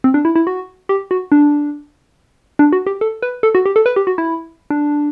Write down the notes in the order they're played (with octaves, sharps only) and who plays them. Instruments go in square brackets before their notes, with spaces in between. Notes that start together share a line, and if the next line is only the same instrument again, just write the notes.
[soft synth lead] C4
D4
E4
E4
F#4
G4
F#4
D4
D4
F#4
G4
A4
B4
A4
F#4
G4
A4
B4
G4
F#4
E4
D4